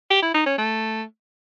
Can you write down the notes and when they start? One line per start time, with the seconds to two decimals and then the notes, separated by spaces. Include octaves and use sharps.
0.11 G4
0.22 E4
0.34 D#4
0.46 C#4
0.58 A3